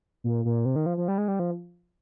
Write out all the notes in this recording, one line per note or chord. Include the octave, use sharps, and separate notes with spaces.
A#2
A#2
C3
D#3
F3
F3
G3
G#3
G3
F3